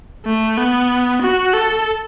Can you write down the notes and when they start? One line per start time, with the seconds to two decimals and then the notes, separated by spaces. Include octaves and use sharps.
0.26 A3
0.57 B3
1.22 F#4
1.53 A4